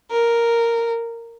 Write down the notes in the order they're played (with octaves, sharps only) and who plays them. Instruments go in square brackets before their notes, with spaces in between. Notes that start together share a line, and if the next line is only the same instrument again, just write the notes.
[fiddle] A#4